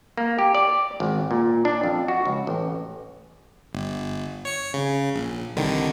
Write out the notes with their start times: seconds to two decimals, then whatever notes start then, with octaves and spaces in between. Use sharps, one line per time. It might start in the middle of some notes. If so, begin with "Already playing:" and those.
0.18 A#3
0.39 G4
0.55 D5
1.00 G#1
1.31 A#2
1.65 D4
1.84 F2
2.08 F#4
2.25 C#2
2.47 A1
3.73 G1
4.45 C#5 C#7
4.74 C#3
5.14 A#1
5.56 C2 D3 D#3